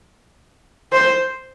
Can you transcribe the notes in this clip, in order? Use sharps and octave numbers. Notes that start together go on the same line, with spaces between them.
C5